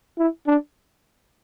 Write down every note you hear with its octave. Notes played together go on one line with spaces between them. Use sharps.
E4
D4